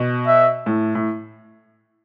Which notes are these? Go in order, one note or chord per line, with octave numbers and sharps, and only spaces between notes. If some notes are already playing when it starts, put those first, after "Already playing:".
Already playing: B2
E5
A2
A2